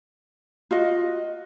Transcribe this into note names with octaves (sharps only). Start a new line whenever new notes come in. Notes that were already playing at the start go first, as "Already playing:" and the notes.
F4 F#4 D#5